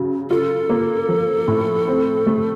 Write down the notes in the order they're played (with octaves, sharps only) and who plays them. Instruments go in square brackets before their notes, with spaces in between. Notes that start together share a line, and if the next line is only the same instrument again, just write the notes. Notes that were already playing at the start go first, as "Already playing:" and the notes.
Already playing: [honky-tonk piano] C#3 F#3
[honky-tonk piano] F4 [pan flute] A4
[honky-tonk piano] A#3
F3
A2
C4
A3